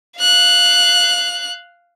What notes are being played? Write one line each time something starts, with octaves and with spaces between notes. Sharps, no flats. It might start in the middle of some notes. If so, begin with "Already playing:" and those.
F5 F#6